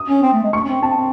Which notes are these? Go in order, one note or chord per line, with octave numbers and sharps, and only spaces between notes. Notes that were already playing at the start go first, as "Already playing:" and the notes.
Already playing: D#6
C#4
C4
A3
G#3
A3 C#6
C#4
C4
C4 A5
C4